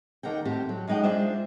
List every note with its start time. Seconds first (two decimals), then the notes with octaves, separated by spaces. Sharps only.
0.23 D#2 A#4 F#5 G5
0.45 A2 C4 G4
0.69 F#3
0.88 F#2 G#3 D#4 F#5 G5
1.03 G#3 D4 F4 C5 E5